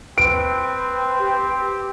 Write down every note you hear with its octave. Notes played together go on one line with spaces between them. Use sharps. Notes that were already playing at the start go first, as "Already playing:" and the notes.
C4 B4 D7
G4